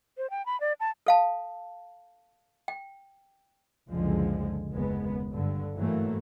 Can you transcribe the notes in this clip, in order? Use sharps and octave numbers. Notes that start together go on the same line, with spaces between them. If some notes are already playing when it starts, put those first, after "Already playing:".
C5
G5
B5
D5
A5
A4 F5 A5
G5
F#1 C#2 D3 F3 G#3
F#1 D#2 G#3 B3
G2 D3
G#2 E3 F#3 A3 A#3